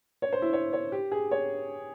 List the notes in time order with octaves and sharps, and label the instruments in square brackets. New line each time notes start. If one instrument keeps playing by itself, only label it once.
[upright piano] C#5
C5
E4
C#5
C#5
G4
G#4
C#5